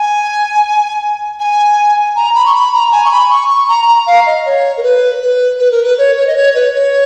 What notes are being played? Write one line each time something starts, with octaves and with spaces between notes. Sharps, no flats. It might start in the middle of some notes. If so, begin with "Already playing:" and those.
Already playing: G#5
G#5
A#5
B5
C#6
B5
A#5
G#5
C#6
B5
C#6
C#6
A#5
A#5
F5
D#5
C#5
A#4
B4
B4
B4
A#4
B4
C#5
C#5
D#5
C#5
B4
C#5